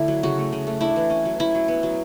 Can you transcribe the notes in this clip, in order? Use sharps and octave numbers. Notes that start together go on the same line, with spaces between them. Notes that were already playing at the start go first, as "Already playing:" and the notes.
Already playing: D3 A3 D4 E4
F#3
C#3 F#4
A3
C#3
A3
D4 E4
E3
C#4
F#3
C#4 E4
F#3
B3
F#3